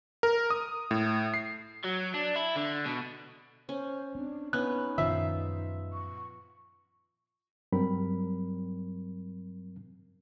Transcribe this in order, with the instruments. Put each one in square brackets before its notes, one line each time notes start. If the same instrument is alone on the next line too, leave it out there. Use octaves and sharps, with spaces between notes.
[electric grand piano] A#4
D#6
A2
C7
[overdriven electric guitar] F#3
D4
E4
D3
B2
[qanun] C#4 [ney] C5
[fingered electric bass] C4 [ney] D4
[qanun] B3 C#4 [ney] D#4 [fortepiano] F#6
[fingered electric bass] F#2 A#2 D#3 [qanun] F3 [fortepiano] E5
[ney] C#6
[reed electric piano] G2 F#3 G3 C4 A#4 B5